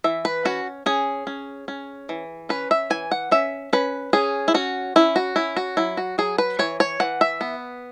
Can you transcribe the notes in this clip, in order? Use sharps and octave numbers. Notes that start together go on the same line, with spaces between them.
E3 E5
B4
C#4 F#4
C#4 G#4
C#4
C#4
E3
C#4 B4
E5
E3 G#5
F#5
C#4 E5
C#4 B4
C#4 G#4
E4
C#4 F#4
C#4 E4
F#4
C#4 E4
F#4
F#3 E4
F#4
F#3 G#4
B4
E3 C#5
C#5
E3 F#5
E5
B3